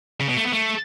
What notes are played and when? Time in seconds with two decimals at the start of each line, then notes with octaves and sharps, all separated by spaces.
0.21 C#3
0.29 B2
0.37 A3
0.45 B3
0.53 A3